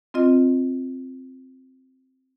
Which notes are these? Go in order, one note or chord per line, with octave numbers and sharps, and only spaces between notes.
C4 F4 D#5